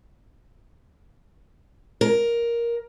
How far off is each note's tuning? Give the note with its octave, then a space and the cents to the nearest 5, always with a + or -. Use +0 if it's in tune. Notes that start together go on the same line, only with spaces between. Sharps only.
A#4 +10